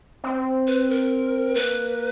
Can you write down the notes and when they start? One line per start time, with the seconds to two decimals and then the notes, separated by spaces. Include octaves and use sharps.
0.24 C4
0.67 B4
0.90 A#4
1.55 A#3 B4